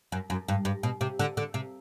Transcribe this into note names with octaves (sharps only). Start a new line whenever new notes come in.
F#2
F#2
G2
G2
B2
C3
D3
D3
C3